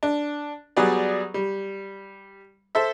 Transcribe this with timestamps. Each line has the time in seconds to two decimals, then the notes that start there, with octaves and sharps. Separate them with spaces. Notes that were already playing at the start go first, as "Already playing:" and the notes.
0.03 D4
0.77 F#3 G3 B3 G#4 D5
1.34 G3
2.75 A4 C5 E5